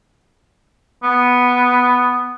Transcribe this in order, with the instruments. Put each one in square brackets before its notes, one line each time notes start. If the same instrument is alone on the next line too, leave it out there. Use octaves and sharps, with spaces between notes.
[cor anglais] B3